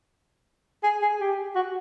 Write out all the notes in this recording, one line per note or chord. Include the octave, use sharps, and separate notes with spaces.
G#4
G#4
G4
F#4